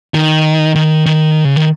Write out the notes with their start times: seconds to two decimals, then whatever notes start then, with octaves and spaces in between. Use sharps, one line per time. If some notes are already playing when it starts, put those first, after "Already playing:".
0.14 D#3
0.75 D#3
1.06 D#3
1.45 C#3
1.56 D#3